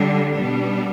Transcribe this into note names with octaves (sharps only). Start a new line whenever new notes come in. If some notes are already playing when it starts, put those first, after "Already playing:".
Already playing: D3 G3 D4
B2 G3 B3 D4